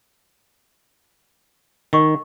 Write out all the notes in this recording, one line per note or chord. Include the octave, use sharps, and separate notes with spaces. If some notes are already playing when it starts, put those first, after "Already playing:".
D#3 D#5 C#6 E6